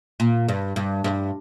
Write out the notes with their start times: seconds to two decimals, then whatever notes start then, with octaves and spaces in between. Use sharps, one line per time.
0.20 A#2
0.48 G2
0.76 G2
1.04 G2